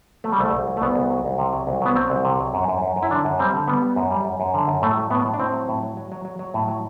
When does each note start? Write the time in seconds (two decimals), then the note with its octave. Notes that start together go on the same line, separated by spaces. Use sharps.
0.24 F#3 A3
0.32 G3
0.39 C2 A3
0.54 C2
0.68 F#3
0.77 A3
0.82 C2 B3
0.95 C2
1.10 F#3
1.25 C2
1.38 C3
1.53 F#3
1.67 C2
1.82 F#3 B3
1.96 F#3 C4
2.10 C2
2.25 C3
2.39 F#3
2.54 F#2
2.68 F#2
2.81 F#2
2.96 F#2
3.03 E4
3.11 D3 D4
3.25 F#2
3.39 G3 C4
3.54 D3
3.68 G3 B3
3.82 G3
3.96 F#2
4.11 G3
4.25 F#2
4.40 F#2
4.54 D3
4.68 F#2
4.82 A2 A3
4.97 F#3
5.10 A2 B3
5.25 A2
5.34 D4
5.40 A2 C4
5.54 F#3
5.69 A2
5.83 F#3
5.97 F#3
6.12 F#3
6.25 F#3
6.39 F#3
6.54 A2
6.68 F#3